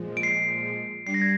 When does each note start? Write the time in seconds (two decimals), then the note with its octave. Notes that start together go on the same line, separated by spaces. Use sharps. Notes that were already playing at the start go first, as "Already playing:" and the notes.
Already playing: A#2 F3 G#3
0.17 D7
0.23 C7
1.06 G3 D4 C7
1.14 A#6
1.22 G#6